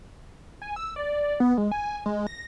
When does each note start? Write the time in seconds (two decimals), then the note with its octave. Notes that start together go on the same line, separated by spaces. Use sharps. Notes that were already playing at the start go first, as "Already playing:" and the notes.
0.62 G#5
0.76 E6
0.96 D5
1.40 B3
1.58 G#3
1.71 G#5
2.06 G#3
2.27 A#6